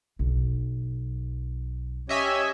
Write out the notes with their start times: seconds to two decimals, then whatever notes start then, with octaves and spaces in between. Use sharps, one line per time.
0.19 B1
2.09 C#4 G4 C#5 D#5 E5 G#5